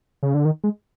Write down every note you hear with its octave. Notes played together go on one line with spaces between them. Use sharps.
C#3
D3
D#3
G#3